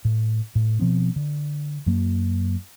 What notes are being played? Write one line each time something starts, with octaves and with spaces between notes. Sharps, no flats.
A2
A2
B2 F3 B3 C4
D3
F#2 F#3 A#3